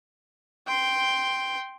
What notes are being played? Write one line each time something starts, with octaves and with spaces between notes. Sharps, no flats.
G5 C6